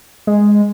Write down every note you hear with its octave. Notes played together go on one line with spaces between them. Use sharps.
G#3